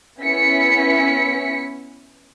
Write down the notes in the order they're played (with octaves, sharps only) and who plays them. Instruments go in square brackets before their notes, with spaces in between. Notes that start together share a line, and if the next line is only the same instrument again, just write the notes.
[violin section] B3 C#4 E4 B6 C#7